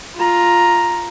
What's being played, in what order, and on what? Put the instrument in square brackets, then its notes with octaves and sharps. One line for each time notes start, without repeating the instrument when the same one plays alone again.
[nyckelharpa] F4 A#5